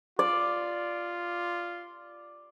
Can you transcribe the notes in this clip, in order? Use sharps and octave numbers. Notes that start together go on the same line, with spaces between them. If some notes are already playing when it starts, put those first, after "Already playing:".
F4 D5